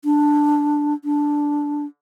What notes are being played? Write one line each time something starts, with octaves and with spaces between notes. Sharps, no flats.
D4
D4